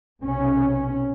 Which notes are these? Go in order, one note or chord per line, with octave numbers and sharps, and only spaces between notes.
B1 C3 C#4